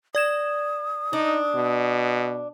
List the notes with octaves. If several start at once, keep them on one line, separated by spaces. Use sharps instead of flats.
D5 D#6 G#6 E7
D4 D#4
B2